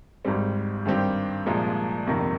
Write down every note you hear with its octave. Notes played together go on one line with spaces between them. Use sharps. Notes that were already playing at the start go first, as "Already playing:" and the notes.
G#1 G#2 G3 C4
G2 D#3 G3 C4 G4
C2 A#2 F3 G#3
G1 F2 C3 D#3 A#3